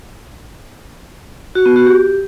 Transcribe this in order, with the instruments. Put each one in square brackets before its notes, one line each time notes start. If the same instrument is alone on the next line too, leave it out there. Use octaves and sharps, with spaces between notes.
[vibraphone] F#4
B3
F#4
G4